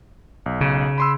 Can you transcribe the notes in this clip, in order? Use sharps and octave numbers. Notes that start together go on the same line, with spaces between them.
B1
C#3
B5 C6 E6